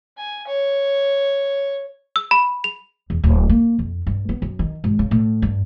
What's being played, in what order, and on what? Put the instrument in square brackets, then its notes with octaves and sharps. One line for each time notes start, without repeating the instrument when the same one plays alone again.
[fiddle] G#5
C#5
[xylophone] E6
B5
F7
[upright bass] E2
D1
A#3
F2
G2
B3
F#2
D#3
G#1
C#3
A2
G2